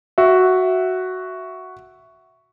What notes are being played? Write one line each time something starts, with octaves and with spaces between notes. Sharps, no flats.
F#4 E5